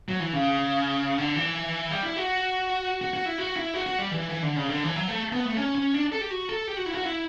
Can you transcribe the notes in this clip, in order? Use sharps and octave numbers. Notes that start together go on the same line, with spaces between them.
F#3
E3
C#3
D3
E3
G3
E4
F#4
F#4
F#4
E4
F#4
E4
F#4
F#4
G3
E3
E3
D3
C#3
D3
E3
F#3
A3
B3
A3
C#4
C#4
D4
A4
G4
F#4
A4
G4
F#4
E4
F#4
E4